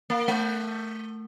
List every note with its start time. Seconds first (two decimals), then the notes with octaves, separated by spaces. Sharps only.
0.10 A#3
0.28 A3